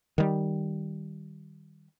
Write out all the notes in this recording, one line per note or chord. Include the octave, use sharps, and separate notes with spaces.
D#3 G3